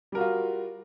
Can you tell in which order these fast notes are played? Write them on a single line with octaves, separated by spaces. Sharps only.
G3 A#4 F#4 F4